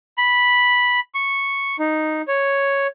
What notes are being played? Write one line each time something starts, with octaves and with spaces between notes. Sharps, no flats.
B5
C#6
D#4
C#5